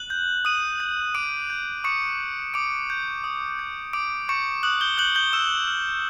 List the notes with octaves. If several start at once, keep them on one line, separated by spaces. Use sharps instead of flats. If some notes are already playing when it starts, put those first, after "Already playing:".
Already playing: F#6 F#7
G6
D#6 D#7
G6
D6 D#6 D7
G6
C#6 D#6 C#7
G6
D6 D#6 D7
G6
D#6
G6
D6 D#6 D7
C#6 G6 C#7
D#6 F#6 F#7
G6 G7
F#6 G6 F#7
G6 G7
C#6 E6 E7
F6